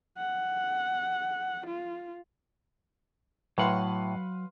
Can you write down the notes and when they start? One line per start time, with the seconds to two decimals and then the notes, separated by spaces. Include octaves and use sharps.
0.18 F#5
1.66 F4
3.58 A2 F#3 B4 F5 F#5 C6